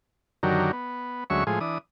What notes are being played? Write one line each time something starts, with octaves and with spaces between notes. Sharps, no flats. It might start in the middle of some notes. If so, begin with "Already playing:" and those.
F#2 D3 D#3 F#3 G4 A#4
B3
D2 F#3 G#3 C#4 E5 C#6
A2 F3 G#3 G#4
E3 D4 D#6